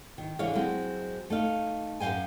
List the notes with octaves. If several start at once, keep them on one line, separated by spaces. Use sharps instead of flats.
D#3
D3 E3 G#3 C#5 F5
F#3 G#3 C4
A3 D#4 F5
F#2 F#3 F5 G5 G#5